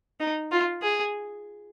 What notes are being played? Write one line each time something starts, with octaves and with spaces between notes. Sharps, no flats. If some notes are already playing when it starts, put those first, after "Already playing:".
D#4
F4
G#4